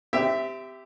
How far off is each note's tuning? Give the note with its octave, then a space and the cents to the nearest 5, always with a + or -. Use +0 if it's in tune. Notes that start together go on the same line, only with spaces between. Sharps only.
C4 -35 G4 +0 E5 +0